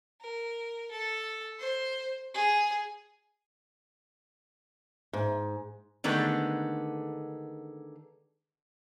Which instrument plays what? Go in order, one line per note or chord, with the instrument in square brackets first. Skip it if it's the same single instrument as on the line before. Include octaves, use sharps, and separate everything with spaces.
[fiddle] A#4
A4
C5
G#4
[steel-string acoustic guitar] G#2
[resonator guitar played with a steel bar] D3 D#3 G#3 A3 B3